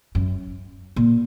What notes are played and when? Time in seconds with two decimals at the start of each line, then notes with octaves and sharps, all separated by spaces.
0.15 F#2
0.96 A#2